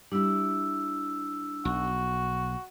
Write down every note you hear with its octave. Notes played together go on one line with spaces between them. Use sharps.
G3 D4 E4 E6
B1 F#4